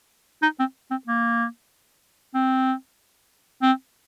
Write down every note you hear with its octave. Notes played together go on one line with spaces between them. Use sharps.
D#4
C4
C4
A#3
C4
C4